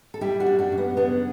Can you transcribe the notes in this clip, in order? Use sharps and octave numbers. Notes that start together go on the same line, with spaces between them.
A4
G3 E4 G4
D4 F#4
F#2
D4 F#4
F#2
B3
C#3 B3 D4